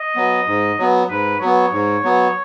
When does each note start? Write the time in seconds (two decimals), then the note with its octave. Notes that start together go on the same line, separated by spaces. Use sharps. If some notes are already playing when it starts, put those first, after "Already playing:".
Already playing: D#5
0.16 F#3 B3
0.47 G#2
0.78 F#3 B3
1.09 G#2 B4
1.40 F#3 B3 C#5
1.72 G#2
2.03 F#3 B3